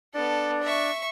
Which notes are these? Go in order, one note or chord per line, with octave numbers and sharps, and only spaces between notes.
B3 D4 A4 D5
E5 C#6